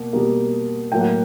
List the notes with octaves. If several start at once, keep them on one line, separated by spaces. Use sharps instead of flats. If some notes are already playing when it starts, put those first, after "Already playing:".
Already playing: B2 A#3
B2 G3 A#3
A2 F#3 A#3 G5
F#5